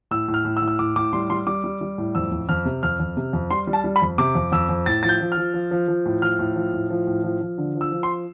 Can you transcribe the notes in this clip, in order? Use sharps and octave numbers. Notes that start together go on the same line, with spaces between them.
A2 E6
A2
F6
A2
E6
A2
E6
A2 D6
A2 D6
G3 C6
G3 C6
G3 D6
G3
G3
A2
F2 E6
F2
F2 F6
C3
F2 F6
F2
C3
F2
G3 C6
G3
A5
G3
B5
F2
C3 D6
F2
F2 E6
F2
A2 A6
F3 A6
G6
F3
F6
F3
F3
F3
F3
A2
F3 F6
A2
F3
A2
F3
A2
F3
F3
D3
F3
E6
F3
C6